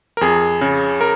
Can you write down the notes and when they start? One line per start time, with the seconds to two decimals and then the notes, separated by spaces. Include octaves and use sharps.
0.17 A#4
0.21 F2 G#4
0.61 C#3
1.01 A#4